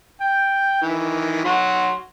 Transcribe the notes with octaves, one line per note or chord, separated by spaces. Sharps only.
G5
D#3 E3
F#3 F#4 C6